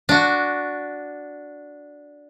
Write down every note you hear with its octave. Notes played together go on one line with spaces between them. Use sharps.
D4 F#4